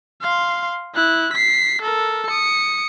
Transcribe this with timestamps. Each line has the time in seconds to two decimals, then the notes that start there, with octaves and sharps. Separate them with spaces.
0.22 F5 C6
0.95 E4 F#6
1.33 B6 C7
1.82 A4 A#4
2.27 D#6 C#7